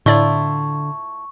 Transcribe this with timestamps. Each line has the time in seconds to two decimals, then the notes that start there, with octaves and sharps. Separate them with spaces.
0.06 A2 D3 A3 E4 F4 D5 C#6